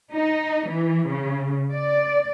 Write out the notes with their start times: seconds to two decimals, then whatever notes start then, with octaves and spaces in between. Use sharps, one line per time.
0.14 D#4
0.68 E3
1.08 C#3
1.73 D5